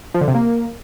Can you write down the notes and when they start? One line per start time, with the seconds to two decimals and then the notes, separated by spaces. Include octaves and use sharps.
0.14 F3
0.21 D3
0.28 C3
0.34 A#3